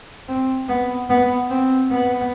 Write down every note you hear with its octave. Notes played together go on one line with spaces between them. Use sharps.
C4
B3
B3
C4
B3